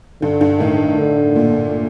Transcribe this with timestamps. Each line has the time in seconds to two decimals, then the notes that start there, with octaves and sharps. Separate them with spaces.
0.22 G2 D3
0.41 G2
0.60 A2 D#3
0.98 D3
1.36 A#2